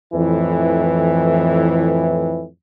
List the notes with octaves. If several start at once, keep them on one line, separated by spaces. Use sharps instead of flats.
F2 A2 E3